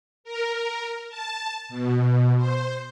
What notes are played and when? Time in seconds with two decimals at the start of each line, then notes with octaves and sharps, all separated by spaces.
0.24 A#4
1.09 A5
1.69 B2
2.37 C5